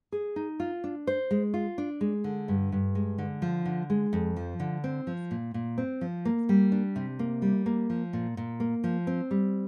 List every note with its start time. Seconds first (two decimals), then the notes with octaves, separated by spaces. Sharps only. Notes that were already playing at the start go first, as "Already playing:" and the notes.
0.12 G#4
0.36 D#4
0.60 F4
0.84 D4
1.07 C5
1.31 G#3
1.54 F4
1.78 D4
2.01 G#3
2.24 D3
2.48 G2
2.72 G2
2.95 G#3
3.18 D3
3.42 F3
3.65 D3
3.90 G#3
4.13 F2
4.37 F3
4.60 D3
4.84 C4
5.07 F3
5.31 A#2
5.54 A#2
5.78 C4
6.01 F3
6.25 A#3
6.49 G3
6.72 D4
6.96 C3
7.19 A#3
7.42 G3
7.66 A#3
7.90 F3
8.13 A#2
8.37 A#2
8.60 A#3
8.84 F3
9.07 C4
9.31 G3